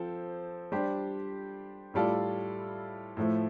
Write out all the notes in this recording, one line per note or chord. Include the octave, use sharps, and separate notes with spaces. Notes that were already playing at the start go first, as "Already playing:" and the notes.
Already playing: F3 C4 A4
G3 D4 G4 C5
A2 G3 F4 A4 D5
A2 F3 A3